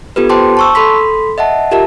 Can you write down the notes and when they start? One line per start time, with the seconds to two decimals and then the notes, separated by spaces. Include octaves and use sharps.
0.16 B3 F4 G4 A4 B4
0.29 C5 G5 A5 C6 D6
0.57 A5 C#6 E6
0.75 A4 B5 C6 B6
1.38 D#5 E5 F#5 A5
1.71 F4 G4 A#4 E5 A5